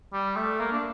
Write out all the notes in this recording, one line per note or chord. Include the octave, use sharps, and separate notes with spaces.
G3
A3
A#3
D4